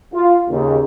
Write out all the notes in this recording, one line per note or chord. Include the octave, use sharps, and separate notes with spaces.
F4
D#2 C#3